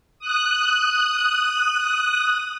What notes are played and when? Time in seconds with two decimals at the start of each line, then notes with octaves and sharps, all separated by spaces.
0.19 D#6 F#6